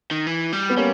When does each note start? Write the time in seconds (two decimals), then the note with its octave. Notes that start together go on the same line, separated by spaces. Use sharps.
0.11 D#3
0.27 E3
0.53 G3
0.70 B3
0.77 G3 A#3 C#4